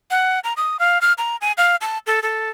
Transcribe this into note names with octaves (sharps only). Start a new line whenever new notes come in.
F#5
A#5
D#6
F5
F6
A#5
G#5
F5
A5
A4
A4